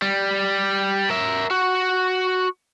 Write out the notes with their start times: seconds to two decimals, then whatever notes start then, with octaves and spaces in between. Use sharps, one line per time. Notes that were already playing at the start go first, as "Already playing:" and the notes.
0.02 G3
1.10 A#4 E5
1.51 F#4